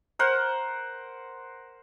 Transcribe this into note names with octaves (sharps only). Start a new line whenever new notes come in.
A#4 C5 F#5